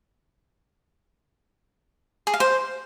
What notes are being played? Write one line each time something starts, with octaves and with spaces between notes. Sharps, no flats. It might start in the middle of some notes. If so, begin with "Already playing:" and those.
G#4
F5
C5